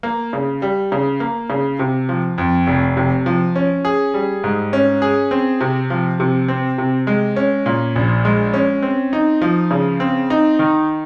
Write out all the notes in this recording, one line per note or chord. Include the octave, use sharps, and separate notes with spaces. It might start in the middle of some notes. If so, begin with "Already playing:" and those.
A#3
C#3
G3
C#3
A#3
C#3
C3
F3
F2
F1
C3
F3
C#4
G#4
G3
G#2
C#4
G#4
C4
C3
F3
C3
C4
C3
G#3
C#4
A#2
A#1
G#3
C#4
C4
D#4
F3
C#3
C4
D#4
D#3